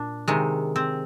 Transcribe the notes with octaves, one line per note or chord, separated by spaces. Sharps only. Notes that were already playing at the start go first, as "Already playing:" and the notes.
Already playing: A#2 D4
C3 D#3 G#3
C4